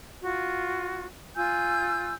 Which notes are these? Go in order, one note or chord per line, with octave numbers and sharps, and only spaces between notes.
F4 F#4
F4 G#5 E6 G6